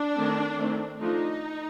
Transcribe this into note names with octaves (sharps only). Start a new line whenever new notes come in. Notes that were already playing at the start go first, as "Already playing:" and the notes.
Already playing: D4
D#3 A3 C4
D#3 A3 C4
F3 A3 D4 D#4